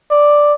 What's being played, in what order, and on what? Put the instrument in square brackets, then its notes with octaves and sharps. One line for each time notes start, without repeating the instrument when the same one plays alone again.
[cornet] D5